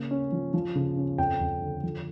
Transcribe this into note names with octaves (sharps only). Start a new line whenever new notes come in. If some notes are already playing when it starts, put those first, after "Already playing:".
Already playing: C#3 A#3
C#4
F3
F3
C#3
C#4
F2 G5
F2
D3
F3